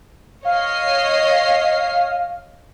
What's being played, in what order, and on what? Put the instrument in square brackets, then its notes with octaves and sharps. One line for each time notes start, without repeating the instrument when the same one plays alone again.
[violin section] C#5 D#5 C7 [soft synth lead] F5